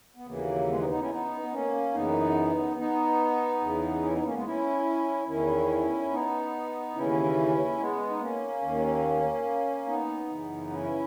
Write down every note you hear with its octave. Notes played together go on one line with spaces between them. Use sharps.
B3
D#2 C#3 E3 F#3 A#3
G#3 B3
B3 D#4
B3 D#4
C#4 E4
B3 D#4
B3
A#3 C#4
F#2 C#3 E3 B3 D#4
B3 D#4
E2 C#3 E3
C#4 E4
B3 D#4
A#3 C#4
G#3 B3
C#4 E4
E2 D#3 C#4 E4
B3 D#4
D#2 C#3 E3 C#4 E4
G#3 B3
D#4
A#3 C#4
D#2 D#3
B3 D#4
F#2 C#3 E3
C#4 E4